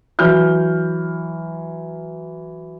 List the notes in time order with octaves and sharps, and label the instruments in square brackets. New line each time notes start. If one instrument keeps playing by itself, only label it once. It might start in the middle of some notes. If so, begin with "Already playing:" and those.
[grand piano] E3 F#3 F6 G6